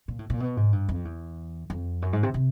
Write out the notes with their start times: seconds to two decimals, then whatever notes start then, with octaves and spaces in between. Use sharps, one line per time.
0.08 A#2
0.19 A2
0.30 A#2
0.40 B2
0.57 G#2
0.72 G2
0.89 F2
1.05 E2
1.70 F2
2.02 F#2
2.13 G#2
2.23 C3
2.34 C3